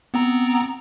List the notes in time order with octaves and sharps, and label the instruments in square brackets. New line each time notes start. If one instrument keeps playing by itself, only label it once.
[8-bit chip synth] B3 C4 A#5